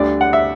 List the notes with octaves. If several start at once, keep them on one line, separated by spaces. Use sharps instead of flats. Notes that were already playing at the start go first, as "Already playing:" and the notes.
Already playing: D2 D3 G3 D5
F#5
E5